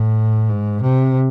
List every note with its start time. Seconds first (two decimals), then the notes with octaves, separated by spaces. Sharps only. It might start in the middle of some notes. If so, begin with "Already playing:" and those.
Already playing: A2
0.49 G#2
0.82 C3